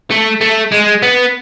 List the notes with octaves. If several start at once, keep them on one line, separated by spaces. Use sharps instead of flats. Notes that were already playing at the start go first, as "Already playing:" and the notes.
A3
A3
G#3
B3